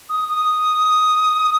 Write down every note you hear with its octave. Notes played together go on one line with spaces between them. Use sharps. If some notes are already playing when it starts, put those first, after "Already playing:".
D#6
D#6